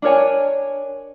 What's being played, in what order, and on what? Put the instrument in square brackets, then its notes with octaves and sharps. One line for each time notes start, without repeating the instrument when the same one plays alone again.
[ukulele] D4 A#4 C#5 G#5